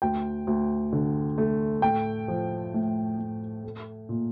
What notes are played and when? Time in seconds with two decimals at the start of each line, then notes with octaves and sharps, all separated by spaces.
0.02 D2 G5
0.47 D2
0.92 D3
1.38 A3
1.82 A2 G5
2.28 F3
2.74 A2
3.18 A2
3.64 A3
4.09 A#2